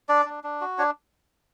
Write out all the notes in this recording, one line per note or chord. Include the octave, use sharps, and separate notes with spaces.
D4 D5
D4
D4
F#4
D4 C#5